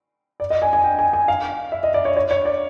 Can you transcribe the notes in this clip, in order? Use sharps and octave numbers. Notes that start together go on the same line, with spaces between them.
D5
D#5
G#5
G#5
G5
G#5
G#5
F5
E5
D#5
D5
C#5
C#5
C#5
D5